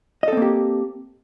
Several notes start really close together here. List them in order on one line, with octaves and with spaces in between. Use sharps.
D#5 A4 C4 A#3 G4